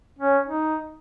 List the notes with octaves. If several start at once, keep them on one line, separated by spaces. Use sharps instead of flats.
C#4
D#4